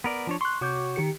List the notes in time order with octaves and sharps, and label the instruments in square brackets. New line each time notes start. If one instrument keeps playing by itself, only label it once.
[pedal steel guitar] B3 A#4 D5
F3 D4 C#5
[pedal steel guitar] C6 [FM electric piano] C#6 F#6
[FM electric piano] C3 D6 G6 [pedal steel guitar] F#4 C#5
[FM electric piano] D#3 G4 C#7